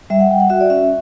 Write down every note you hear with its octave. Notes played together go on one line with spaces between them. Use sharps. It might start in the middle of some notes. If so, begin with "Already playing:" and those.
G3 E5
F#5
G3 G5
F#5
F#4 E5
D5
C#4 E5